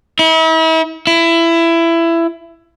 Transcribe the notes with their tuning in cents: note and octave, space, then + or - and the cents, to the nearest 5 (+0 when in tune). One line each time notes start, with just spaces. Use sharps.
E4 -40
E4 +20